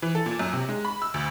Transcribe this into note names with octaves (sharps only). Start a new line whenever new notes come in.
E3
A4
A#2
F#2
C3
G#3
B5
E6
D2